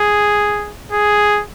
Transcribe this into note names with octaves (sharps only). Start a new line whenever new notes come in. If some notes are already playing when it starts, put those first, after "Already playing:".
Already playing: G#4
G#4